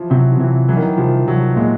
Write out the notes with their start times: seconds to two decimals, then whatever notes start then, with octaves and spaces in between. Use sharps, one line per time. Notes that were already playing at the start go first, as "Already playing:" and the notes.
Already playing: E3 F3
0.10 C3 F#3
0.32 F3
0.40 C3 E3
0.68 E3 F#3
0.76 D#3
0.83 E3
0.97 C2 F3
1.27 C2 F#3
1.56 A#2 G#3